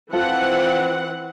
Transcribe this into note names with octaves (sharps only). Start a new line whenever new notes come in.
E3 F3 C4 F4 A4 F#5